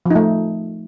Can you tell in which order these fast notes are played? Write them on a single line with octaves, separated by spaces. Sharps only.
F3 D#4 A3